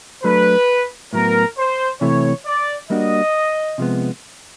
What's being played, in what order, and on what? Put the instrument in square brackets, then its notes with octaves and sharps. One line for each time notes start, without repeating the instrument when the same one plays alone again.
[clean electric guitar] F#3 A3 D4 [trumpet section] B4
[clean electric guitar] A2 F#3 B3 [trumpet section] A#4
[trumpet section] C5
[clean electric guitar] C3 E3 A3 [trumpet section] C#5
[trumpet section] D5
[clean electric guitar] G3 A#3 D4 F#4 [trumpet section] D#5
[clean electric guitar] C3 F3 G#3 B3